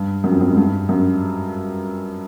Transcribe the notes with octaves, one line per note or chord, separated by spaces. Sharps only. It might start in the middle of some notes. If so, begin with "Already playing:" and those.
Already playing: G2
F#2
F2
F#2
G#2
G2
F#2